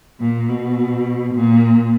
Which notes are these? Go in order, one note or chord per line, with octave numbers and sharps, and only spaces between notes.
A#2
B2
A#2